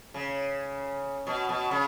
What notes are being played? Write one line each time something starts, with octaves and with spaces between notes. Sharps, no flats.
C#3
B2
B2
C#3